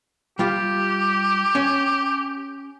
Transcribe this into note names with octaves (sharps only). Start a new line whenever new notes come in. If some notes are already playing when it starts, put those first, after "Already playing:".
G3 F4 G4 F5
C#4